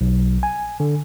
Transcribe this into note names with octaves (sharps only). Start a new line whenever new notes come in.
B1
G#5
D3